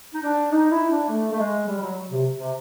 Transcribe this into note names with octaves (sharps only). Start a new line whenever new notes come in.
D#4
D4
D#4
E4
D4
A3
A3
G#3
G3
G3
F#3
C3
C3